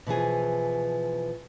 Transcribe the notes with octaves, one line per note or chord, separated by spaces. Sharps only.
B2 E3 F3 G#4